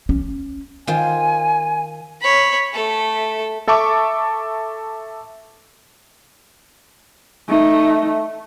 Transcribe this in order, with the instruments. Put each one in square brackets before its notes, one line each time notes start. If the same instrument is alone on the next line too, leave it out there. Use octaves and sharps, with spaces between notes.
[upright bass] C#4
[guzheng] D#3 F4 C5 [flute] G#5
[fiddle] C#5 B5
A3 A4
[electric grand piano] A4 E5 A5 C#6 D6
[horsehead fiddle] A3 D#4